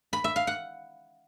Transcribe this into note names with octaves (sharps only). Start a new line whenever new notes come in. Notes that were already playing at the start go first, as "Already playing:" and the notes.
B5
E5
F5
F#5